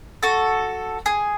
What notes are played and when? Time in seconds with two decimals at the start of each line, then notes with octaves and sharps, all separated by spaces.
0.23 F#4 A4
1.06 G#4